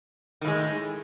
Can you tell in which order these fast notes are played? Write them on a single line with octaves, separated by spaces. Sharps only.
D#3 A2 G#3